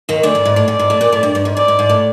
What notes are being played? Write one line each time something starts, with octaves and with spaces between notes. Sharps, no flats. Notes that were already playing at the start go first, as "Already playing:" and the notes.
D#2 D#3
D2 D3 D5
G#2
G#2
A2
G#2 D5
G#2
A2
A#2
A2
G2
G2
G#2
G#2 D5
G#2
G#2
A2